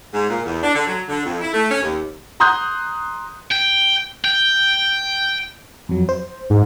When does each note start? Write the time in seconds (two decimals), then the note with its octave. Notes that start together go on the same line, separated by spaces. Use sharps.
0.14 G#2
0.30 A#2
0.46 E2
0.63 D4
0.75 D3
0.87 F#3
1.09 D3
1.25 F2
1.41 E4
1.53 A3
1.71 C#4
1.82 D#2
2.40 A#5 C6 D#6 F#6 G6
3.52 G5
4.25 G5
5.89 F2 F#3
6.09 C5
6.50 G#2